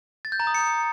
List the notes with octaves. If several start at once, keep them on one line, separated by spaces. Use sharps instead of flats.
A6
G6
A#5
D#6
C#7